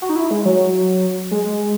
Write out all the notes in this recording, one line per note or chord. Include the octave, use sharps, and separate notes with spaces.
F#4
D#4
E4
G#3
F#3
G#3